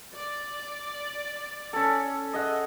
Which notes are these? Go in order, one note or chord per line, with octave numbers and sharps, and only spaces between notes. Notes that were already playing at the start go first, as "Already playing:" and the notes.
D5
C#4 A4
G#4 D#5 E5 F#5